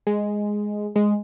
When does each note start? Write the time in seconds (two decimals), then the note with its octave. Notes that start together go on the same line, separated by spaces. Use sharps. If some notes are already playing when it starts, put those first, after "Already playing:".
0.07 G#3
0.96 G#3